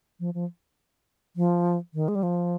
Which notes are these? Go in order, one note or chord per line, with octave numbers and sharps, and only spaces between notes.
F3
F3
F3
D#3
G#3
G3
F3